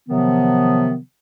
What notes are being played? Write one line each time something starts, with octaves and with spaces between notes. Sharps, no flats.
C3 D#3 F3 F#3 B3